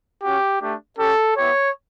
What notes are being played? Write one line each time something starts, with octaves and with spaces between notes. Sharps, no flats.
C#4 F#4 G4
A3 D4 G4
C#4 G4 A4
B3 E4 G4 C#5